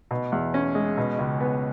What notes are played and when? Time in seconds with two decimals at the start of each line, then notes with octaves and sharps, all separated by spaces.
0.11 B2
0.32 E2
0.54 C#4
0.75 G#3
0.98 B2
1.19 C#2
1.40 B3